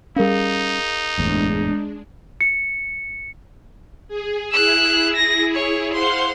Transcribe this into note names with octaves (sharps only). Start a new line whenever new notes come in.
G3 C#4 D#4 G#4 A#4 F5
F#1 E2 A2 G#3 D4
C#7
G#4
E4 G#4 E6 F#6
A#6
C#5
C5 F5 F#5 C6